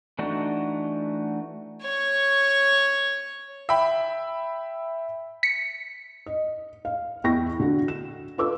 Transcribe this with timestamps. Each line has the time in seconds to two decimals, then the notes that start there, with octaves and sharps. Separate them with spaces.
0.19 E3 A3 D4 D#4 F#4
1.82 C#5 C#6
3.69 E5 G5 B5
5.43 B6 C#7
6.26 D#5
6.85 F5
7.24 E2 E4 G5 C#6 A#6
7.60 D3 F#4
7.88 E7
8.38 F4 A4 B4 D6 E6